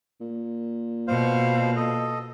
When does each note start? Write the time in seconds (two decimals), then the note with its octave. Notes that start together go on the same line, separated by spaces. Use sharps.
0.20 A#2
1.08 B2 C5 F5
1.76 A4 D#5